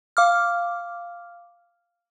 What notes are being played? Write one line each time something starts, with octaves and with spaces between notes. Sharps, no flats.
F5 D6 F6